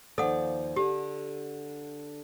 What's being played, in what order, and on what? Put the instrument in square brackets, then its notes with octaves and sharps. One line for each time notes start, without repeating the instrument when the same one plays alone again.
[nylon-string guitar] D#2 F3 D5 [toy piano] A4 F#5
[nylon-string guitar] D3 [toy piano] G4